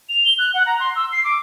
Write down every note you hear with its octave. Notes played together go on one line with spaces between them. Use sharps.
F7
G7
F#6
F#5
A#5
C6
E6
C7
D6